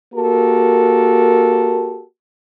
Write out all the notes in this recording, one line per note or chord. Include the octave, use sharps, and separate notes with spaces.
A#3 F#4 G4 A4 A#4